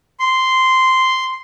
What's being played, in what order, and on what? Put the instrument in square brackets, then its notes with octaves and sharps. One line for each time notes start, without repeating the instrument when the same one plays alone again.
[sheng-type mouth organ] C6